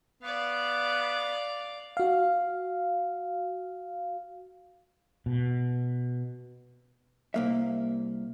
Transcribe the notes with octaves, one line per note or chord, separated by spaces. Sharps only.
B3 D5 F5
F#4 F5
B2
C2 A#3 E5